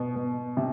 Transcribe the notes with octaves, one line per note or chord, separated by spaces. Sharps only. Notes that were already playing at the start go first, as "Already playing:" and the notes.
Already playing: B2
B2
C3